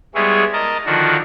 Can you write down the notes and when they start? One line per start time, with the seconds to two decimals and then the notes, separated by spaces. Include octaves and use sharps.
0.15 G3 G#3 B3 E4 G#4 C#5
0.53 A#4 D#5 A5 A#5
0.86 D3 D#3 F3 D4 F#4